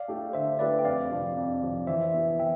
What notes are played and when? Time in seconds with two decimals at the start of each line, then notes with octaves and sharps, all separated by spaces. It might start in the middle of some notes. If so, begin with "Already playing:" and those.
Already playing: D5 F5
0.08 A3 D4 G4
0.33 D3 C5 E5
0.59 A3 D4 G4 B4 D5
0.79 G5
0.85 F2 D5 F5
1.11 C3 F3
1.37 F2
1.62 C3 F3
1.87 E3 C5 E5
2.13 B3 E4 G4
2.39 E3 E5 G5